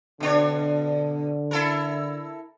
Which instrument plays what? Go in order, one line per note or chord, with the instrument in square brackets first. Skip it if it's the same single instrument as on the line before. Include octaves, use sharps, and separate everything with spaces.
[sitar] B2 D4 C#5 [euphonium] D3
[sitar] E4 A4 A#4